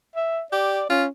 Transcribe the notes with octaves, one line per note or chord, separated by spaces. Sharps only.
E5
G4 D5
C#4 F4